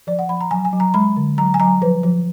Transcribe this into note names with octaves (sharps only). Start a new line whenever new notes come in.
F3 D5
F#5
F3 B5
A#5
F#3 G#5
G#5
F#3
A#5
G#3 B5
D3
F#3 A#5
G#5
F#3 A#5
F3 B4
F3